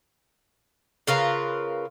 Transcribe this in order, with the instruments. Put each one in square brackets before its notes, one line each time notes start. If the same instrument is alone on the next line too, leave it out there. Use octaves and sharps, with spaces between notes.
[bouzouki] C#3 F4 A#4 B4